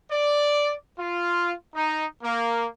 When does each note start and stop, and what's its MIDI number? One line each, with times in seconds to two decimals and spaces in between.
0.11 0.74 74
0.99 1.54 65
1.76 2.05 63
2.24 2.67 58